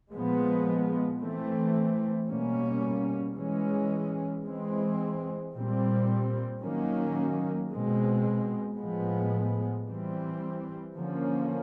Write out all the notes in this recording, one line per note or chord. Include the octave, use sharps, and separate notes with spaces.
A#2 F3 G#3 B3
E3 A3 C4
B2 G3 A#3 C#4
E3 G#3 C#4
E3 G#3 C4
A#2 G3 C4
D#3 F#3 A#3 C#4
B2 G#3 C4
A2 F3 G#3 B3
E3 G3 C4
D3 F3 A#3 C#4